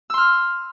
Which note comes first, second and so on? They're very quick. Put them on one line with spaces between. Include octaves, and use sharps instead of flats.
E6 C6 F6